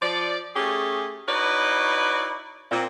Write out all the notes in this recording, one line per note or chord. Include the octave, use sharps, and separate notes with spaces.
F3 D5
A3 C#4 G4 G#4
D#4 E4 F#4 B4 C#5 D5
A#2 C4